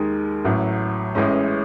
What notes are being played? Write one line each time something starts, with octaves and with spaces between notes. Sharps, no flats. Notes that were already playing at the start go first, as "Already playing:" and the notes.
Already playing: D#2 D#3 G#3
A1 A2 F#3
A1 A2 E3 G#3 C#4